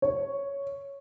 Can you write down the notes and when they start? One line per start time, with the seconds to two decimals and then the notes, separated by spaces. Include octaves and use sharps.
0.02 C#5